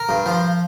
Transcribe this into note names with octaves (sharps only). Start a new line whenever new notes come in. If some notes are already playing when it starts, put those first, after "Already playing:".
Already playing: A#4
G2
F3